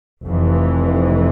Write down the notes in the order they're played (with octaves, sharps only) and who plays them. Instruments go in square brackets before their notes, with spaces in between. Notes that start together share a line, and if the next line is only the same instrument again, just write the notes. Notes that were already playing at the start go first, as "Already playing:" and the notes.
[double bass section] F1 F2 E3